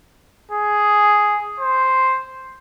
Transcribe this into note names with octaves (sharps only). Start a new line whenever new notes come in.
G#4
C5